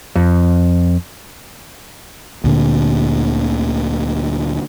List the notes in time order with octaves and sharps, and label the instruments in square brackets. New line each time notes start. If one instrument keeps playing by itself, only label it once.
[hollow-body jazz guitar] F2
[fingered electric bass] D2 A#2 D3